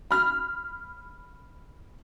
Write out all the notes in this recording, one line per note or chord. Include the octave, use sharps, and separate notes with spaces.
B5 F6